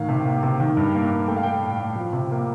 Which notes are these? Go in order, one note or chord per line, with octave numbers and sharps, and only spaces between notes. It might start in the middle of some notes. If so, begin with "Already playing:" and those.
Already playing: A2 D#3 F5
C3
A#3
C3
D#3
G2
A#3
G2
A3 G5
F5
A3 G5
A2
A2
F3
C3
A#3